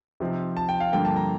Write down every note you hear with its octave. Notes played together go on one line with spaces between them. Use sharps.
C3 F3 C4 D#4
A5
G5
F5
G2 D3 F3 A#3 G5
A5
A#5